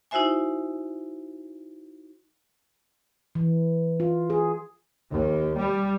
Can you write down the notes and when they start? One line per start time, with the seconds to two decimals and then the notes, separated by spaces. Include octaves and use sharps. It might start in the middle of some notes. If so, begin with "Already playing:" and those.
0.11 D#4 E4 F#4 C5 E5 G#5
3.35 E3
4.00 F4
4.30 G#4
5.12 D#2
5.57 G3